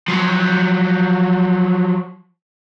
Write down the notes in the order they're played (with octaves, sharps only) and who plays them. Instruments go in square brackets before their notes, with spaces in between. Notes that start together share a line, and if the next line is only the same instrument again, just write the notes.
[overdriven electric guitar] F3 F#3